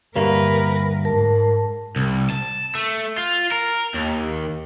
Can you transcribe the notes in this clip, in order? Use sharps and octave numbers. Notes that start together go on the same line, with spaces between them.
D2 G2 A#3 A#4 B4
G#2 A#4 A5
C2
A5
A3
F4
A#4
D#2